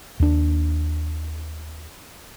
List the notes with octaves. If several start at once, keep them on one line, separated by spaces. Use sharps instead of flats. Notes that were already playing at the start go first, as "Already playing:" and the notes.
D#2 D4